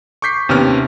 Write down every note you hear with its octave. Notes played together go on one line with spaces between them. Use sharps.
C#6 D6 G6 B6 C7
D#2 C3 B3 C#4 F6